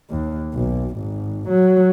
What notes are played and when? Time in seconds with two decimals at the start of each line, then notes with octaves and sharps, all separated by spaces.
0.11 D#2
0.54 B1
0.98 G#1
1.49 F#3